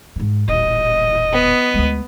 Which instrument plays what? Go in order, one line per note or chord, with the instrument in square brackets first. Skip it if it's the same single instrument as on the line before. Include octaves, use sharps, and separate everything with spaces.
[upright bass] G#2 D#3
[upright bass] D#1 A1 [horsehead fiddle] D#5
[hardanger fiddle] B3
[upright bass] D2 G#3